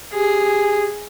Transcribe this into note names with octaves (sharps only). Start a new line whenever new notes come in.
G4 G#4